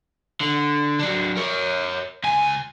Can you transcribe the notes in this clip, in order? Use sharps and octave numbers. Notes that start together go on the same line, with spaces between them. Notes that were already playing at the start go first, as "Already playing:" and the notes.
D3
F#3 D4
A#4 C#5
C#2 G#5